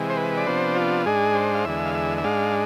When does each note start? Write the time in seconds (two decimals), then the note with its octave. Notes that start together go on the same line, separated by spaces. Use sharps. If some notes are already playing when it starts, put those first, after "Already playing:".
Already playing: C3 E3 G#3
0.10 C5
0.17 B4
0.37 D5
0.46 C3 F3 B3 D4 C5
0.76 F4
1.06 G#2 G#3 D4 G#4
1.35 C5
1.54 F5
1.65 E2 D3 G#3 E5
1.86 F5
1.95 E5
2.18 E5
2.24 G#2 G#3 D4 F5